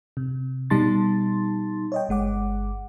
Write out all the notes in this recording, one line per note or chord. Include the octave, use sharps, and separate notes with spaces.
C3
B2 G3 D#4 A5 C6 A6
C#5 D#5 G5
G1 G#3 F#5 D6